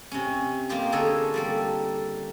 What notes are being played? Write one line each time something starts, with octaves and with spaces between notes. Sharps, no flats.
C3 C#4
A#3 D#4 F4 G4
D3 G#4 A4 C#5 D#5
G3 A#3 A4